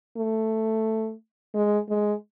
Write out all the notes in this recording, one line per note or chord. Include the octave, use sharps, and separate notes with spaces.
A3
G#3
G#3